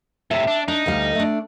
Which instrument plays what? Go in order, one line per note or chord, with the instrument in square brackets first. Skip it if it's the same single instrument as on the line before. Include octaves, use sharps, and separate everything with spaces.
[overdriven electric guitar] A2 C3 [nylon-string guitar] E5
[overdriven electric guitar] D4
[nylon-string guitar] D4 [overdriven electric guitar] D#4
[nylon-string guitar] D2 G3 F5
A3 D4